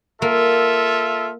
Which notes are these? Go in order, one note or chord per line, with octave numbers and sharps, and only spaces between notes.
A#3 F4 A4 E5